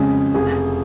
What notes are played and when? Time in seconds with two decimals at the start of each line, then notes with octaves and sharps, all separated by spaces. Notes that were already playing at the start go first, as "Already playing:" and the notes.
Already playing: F2 C#3 G#3 G#5
0.34 F1 G#4